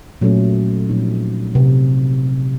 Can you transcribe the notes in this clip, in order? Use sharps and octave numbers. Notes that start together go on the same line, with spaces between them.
A#2 F#3 A3 C#4
A#2 F3 C4 D#4
C3